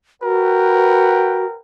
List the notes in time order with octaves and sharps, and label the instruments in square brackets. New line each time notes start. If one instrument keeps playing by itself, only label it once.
[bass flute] F#4 [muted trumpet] A#4 [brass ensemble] B4 F#5 G5